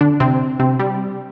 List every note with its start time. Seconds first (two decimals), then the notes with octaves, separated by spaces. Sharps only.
0.01 D3 D4
0.20 C3 C4
0.59 C3 C4
0.79 G3